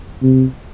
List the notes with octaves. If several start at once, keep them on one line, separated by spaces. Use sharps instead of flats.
C3